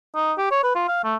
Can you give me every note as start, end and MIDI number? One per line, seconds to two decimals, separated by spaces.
0.16 0.33 63
0.38 0.48 67
0.51 0.60 73
0.64 0.71 71
0.75 0.86 65
0.88 1.00 77
1.04 1.16 57